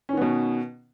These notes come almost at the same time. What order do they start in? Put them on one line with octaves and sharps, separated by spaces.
C#4 D#3 B3 B2